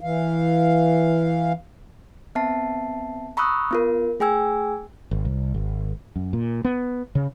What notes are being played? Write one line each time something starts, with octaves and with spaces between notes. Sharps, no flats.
E3 F5
B3 C4 E5 A5 C7
A#5 B5 C#6 D#6 E6 F#6
B3 F4 A#4
A3 G#4 G5 G#5 E6 G#6
G#1
C2
G#1
F#2
A#2
B3
C#3